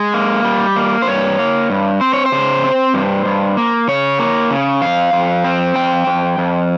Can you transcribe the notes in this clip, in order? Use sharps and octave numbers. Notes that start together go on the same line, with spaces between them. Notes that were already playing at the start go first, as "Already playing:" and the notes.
Already playing: G#3 D#5
A#3
G3
A#3
C5
G2 C#5
A#3
G2
C4 C5
C#5
C5
C#3
C4
G2
G2
A#3
C#3 C#5
A#3
C#3
F2 F5
F2
C4
F2 G5
F2
F2